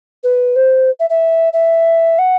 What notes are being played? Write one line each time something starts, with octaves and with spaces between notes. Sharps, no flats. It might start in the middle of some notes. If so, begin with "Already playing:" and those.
B4
C5
E5
E5
E5
F#5